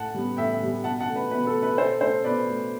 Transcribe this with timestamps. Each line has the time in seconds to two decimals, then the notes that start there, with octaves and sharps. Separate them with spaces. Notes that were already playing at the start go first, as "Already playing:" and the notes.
Already playing: A2 F#5 A5
0.14 G3 B3
0.37 A2 E5 G5
0.61 G3 B3
0.84 B2 F#5 A5
1.00 F#5 A5
1.08 A3
1.16 B4
1.31 B2 B4
1.47 A4
1.54 A3
1.63 B4
1.78 B2 A4 C5
2.01 A3 A4 C5
2.24 B2 B4 D5
2.48 A3